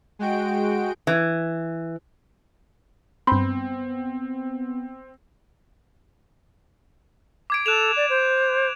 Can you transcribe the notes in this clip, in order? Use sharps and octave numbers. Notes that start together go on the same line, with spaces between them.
G#3 F#4 G5 D7
E3
G2 B3 C4 B5 C6 G6
D6 G#6 D7
A4 F#6 E7 F7
D5
C5